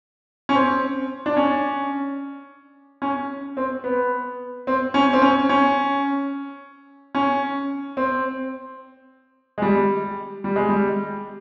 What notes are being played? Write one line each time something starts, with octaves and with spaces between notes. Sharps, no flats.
C#4
C4
D4
C#4
C#4
C4
B3
C4
C#4
C4
C#4
C#4
C#4
C4
G#3
G3
G3
G#3
G3